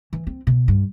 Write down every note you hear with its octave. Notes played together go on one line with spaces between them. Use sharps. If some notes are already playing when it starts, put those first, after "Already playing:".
E3
C4
B2
G2